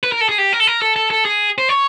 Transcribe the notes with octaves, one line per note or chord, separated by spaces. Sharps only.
B4
A#4
A4
G#4
G4
A#4
A4
A#4
A4
A4
A4
G#4
C5
C#5